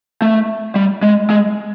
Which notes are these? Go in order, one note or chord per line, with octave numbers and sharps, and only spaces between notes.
A3
G3
G#3
G#3